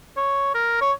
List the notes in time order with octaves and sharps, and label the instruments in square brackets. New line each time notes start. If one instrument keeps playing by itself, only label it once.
[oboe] C#5
A#4
C#5